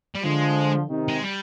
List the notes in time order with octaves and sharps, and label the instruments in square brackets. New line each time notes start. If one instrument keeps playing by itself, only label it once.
[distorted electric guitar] G3
[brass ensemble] D3 F3 [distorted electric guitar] G#3
[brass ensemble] C3 D#3
[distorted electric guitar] G#3
G3